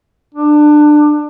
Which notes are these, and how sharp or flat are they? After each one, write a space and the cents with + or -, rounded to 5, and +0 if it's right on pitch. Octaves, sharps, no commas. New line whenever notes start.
D4 +25